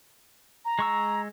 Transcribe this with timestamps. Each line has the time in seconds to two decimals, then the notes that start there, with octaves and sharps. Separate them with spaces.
0.65 A#5
0.79 G#3 C#6 E6